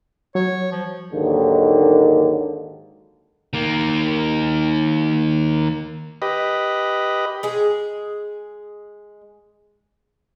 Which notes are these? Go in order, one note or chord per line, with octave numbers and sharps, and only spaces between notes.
F#3 C#5
F3
D#2 G#2 D3 D#3 F#3 A#3
D#3 A#3
G4 B4 D#5
G#3 G#4